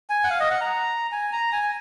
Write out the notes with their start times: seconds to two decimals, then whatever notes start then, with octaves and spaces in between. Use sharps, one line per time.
0.10 G#5
0.24 F#5
0.30 F5
0.40 D#5
0.51 F#5
0.61 A#5
1.12 G#5
1.32 A#5
1.52 G#5